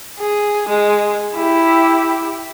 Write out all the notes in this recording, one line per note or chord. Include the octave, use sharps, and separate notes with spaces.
G#4
G#3
E4 G4